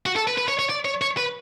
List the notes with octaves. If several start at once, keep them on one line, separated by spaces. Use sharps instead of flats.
F#4
A4
B4
B4
C#5
C#5
D5
C#5
C#5
B4